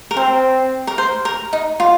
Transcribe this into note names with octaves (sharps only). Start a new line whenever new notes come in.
A#4
C4 C5
A#4
C5
A#4
D#4
F4